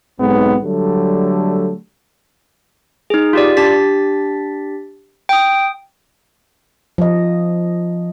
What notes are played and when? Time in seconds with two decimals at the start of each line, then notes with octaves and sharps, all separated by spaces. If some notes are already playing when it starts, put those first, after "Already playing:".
0.19 B1 G#2 B3 C4
0.63 D3 F#3 G3 A3
3.10 D#4 G#4
3.33 F4 G4 D5
3.57 D4 G4 A6 B6
5.29 G5 D#6
6.98 F3 D#5